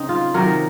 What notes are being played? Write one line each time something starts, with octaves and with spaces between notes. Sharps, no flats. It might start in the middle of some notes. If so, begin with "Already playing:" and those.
Already playing: C#3 C4 D#4
F4
C3 D#3 F#3 A#4